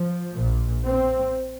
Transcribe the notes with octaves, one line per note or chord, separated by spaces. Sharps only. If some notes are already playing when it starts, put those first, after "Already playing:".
Already playing: F3
A#1 A#2
C4